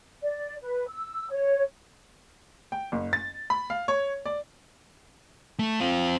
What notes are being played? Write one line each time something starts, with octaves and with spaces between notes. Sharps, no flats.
D5
B4
E6
C#5
G5
F#1
A6
B5
F5
C#5
D5
A3
C4 F4